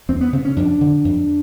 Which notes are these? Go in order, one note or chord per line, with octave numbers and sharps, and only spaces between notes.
E2 C4
B3
C#3 C4
C#4
F2 D4
D3
F2